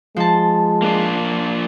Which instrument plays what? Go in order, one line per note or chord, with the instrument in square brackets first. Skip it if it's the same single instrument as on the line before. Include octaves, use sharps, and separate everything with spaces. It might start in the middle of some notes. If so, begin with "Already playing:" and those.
[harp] F3 A5 [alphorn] G#3
[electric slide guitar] A#3 D4 F4